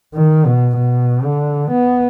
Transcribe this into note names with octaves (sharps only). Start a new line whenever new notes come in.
D#3
B2
B2
D3
B3